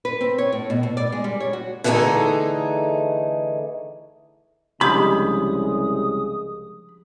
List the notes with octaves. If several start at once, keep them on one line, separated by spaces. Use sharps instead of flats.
B4
C4
C#5
A2
B2
A2
D5
G#3
G3
C#5
F#4
D3 E3 A3 C4 D#4 G#4
C2 C#3 F3 G#3 D4 G4 B5 D#6